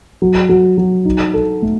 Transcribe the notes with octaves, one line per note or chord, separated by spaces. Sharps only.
F#3
F#3
F#3
D#4
A4
A3